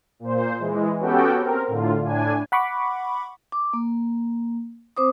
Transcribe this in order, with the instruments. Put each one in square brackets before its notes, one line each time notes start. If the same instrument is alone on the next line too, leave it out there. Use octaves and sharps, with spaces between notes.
[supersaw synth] A#2 C5
E3 G#3
B3 C#4 F#4 G4 A4 G5
C4 A#4
A2 D3 F4
A2 D4 G#5
[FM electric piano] F#5 B5 C#6 D6
[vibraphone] D6
A#3
C4 C5 D6 D#6